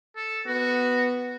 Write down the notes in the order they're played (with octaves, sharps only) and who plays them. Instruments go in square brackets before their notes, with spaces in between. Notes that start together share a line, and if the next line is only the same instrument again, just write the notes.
[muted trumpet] A4
[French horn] B3 [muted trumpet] F#4